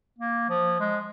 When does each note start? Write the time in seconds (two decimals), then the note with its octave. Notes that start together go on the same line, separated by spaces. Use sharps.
0.18 A#3
0.49 F3
0.80 G#3